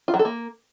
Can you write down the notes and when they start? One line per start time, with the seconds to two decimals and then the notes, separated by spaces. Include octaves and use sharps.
0.08 F4
0.14 F#3
0.19 A4
0.25 A#3